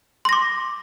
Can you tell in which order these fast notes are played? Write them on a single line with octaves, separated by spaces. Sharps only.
C6 A#6 D6